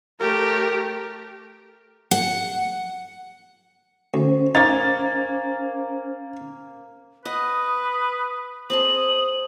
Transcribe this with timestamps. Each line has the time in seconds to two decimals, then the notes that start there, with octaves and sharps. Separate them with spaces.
0.20 A3 G4 A#4
2.11 F#5
4.14 D2 C#4 C5
4.55 A#3 D#4 C#5 G#5 A6
7.25 B4 D#5 F#5 D#6
8.70 C4 G#4 A5 D#6 F#7